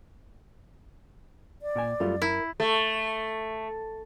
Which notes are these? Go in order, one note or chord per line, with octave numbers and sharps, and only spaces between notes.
D5
A#2 G5 G#5
F#2 G3 A3 F4
E4 A#4
A3